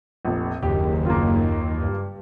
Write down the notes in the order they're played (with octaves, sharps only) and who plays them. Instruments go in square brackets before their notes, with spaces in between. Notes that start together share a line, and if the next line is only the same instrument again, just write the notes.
[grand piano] F1 A#1
[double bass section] F#1 D#3 [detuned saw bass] D#2 [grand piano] G4
[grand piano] A#3 F4
[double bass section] G2